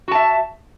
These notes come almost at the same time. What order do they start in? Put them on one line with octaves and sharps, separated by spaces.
F#4 A5 E5